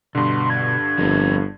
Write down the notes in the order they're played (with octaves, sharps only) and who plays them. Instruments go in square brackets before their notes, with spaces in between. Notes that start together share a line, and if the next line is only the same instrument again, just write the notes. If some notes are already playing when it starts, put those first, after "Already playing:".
[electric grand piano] G2 D3 [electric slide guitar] B2 [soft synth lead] C6
[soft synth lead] G#6
[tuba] G1 [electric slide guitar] F3 C4 A#4